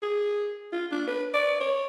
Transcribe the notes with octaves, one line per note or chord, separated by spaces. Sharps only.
G#4
F4
D4
B4
D5
C#5